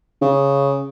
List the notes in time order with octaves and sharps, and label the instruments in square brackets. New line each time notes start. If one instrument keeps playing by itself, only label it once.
[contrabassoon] C#3